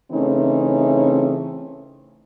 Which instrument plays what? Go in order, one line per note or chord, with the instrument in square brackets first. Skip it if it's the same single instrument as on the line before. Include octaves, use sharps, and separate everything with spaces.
[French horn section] C#3 E3 A3 C4 C#4 D#4